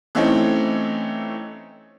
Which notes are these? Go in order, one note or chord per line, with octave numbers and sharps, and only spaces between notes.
E3 A3 C4 C#4 D#4